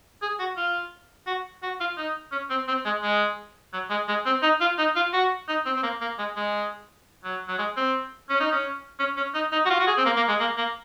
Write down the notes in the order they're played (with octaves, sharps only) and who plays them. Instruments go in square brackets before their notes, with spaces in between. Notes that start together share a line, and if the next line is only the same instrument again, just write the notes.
[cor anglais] G#4
F#4
F4
F#4
F#4
F4
D#4
C#4
C4
C4
G#3
G#3
F#3
G#3
G#3
C4
D#4
F4
D#4
F4
F#4
D#4
C4
C4
A#3
A#3
G#3
G#3
F#3
F#3
G#3
C4
C#4
D#4
C#4
C#4
C#4
D#4
D#4
F#4
F4
F#4
G#4
C4
A#3
A#3
G#3
A#3
A#3